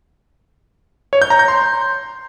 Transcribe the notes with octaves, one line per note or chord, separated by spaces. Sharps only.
C#5
G6
A#5
G6
C6